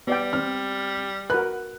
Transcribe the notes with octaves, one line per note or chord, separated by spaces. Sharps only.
G3 B3 D5 G5
C4 F6
F#4 A#4 B4 F#6